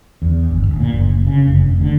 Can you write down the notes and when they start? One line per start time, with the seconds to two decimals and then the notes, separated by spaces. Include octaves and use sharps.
0.22 E2
0.50 G1
0.67 D1
0.80 A#2
0.92 F#1
1.27 C#3
1.47 F#1
1.66 F1
1.81 D3